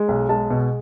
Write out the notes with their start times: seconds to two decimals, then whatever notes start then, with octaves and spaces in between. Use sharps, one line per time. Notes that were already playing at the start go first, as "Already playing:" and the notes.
Already playing: G#3
0.08 B1
0.29 G#3 A5
0.50 B2